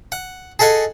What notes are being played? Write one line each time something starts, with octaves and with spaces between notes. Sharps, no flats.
F#5
G#4 A4 D#5 F#5 G#5